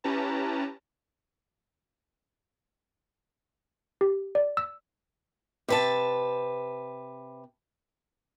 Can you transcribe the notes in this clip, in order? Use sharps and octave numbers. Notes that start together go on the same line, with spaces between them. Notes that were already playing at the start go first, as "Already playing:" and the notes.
C#4 E4 G4 B4 A5 A#5
G4
D5
E6
C3 B4 A5